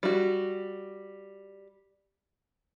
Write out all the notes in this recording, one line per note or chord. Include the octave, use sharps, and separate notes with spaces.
G3 F#4